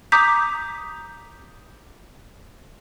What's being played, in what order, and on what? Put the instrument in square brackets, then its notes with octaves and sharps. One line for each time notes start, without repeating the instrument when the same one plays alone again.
[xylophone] A#5 D6 D#6 G6 B6